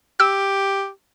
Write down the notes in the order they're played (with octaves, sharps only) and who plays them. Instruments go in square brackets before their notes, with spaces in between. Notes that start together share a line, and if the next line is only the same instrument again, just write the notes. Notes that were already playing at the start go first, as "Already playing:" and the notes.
[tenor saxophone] G4 [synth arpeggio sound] E6